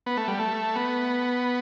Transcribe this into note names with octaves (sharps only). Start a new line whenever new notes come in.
B3
A3
G3
A3
B3